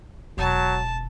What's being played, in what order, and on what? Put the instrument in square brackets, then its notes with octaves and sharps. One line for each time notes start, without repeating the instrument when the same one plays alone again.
[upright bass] E1 [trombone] F#3 [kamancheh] A5